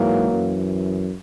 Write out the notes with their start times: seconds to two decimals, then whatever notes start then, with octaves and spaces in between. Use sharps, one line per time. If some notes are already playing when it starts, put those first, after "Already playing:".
Already playing: G#2 E3 F#3 A#3
0.30 F#2 E3